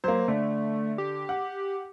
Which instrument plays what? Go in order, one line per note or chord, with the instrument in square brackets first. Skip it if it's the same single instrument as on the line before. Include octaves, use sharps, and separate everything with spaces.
[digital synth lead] F#3 [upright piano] A#3 C5
[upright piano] D3 [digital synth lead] A3
[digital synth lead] G4
[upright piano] F#5